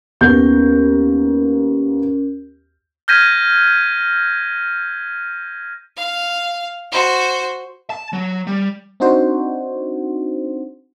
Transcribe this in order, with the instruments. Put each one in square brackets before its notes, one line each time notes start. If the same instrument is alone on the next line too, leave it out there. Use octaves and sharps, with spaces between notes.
[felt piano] D#2 B3 G6 [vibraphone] C#4 A#4
[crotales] F6 G6 G#6 A#6 B6 D#7
[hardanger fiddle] F5
F#4 C5
[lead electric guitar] A5
F#3
G3
[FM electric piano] C4 D4 D#4 F#4 C5